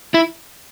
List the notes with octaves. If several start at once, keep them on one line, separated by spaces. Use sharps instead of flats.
E4